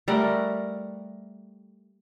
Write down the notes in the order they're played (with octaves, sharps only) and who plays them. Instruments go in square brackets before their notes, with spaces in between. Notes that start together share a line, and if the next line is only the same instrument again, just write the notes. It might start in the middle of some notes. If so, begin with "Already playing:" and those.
[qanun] G3 A3 A#4 F#5